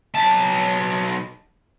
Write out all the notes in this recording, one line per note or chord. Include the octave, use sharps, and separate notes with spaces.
B1 A5